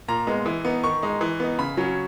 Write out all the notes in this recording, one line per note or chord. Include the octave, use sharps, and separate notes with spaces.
A#2 A#5
G#3 B3
E3
B3 D#4
D#3 C#6
G#3 D#4
E3
B3 D#4
C#3 B5
F#3 C#4